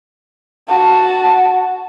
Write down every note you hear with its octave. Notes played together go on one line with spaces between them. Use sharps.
F#4 A5